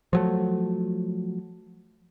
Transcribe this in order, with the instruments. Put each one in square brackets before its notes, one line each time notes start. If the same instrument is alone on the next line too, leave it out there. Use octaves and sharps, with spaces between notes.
[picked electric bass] F3 F#3 A3